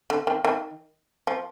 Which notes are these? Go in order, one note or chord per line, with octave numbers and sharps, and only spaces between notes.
D3
D#3
D#3
F3